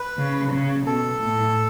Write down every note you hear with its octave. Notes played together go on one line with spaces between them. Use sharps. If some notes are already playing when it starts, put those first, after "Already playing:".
Already playing: B4
C#3
C#3
B2 A4
A2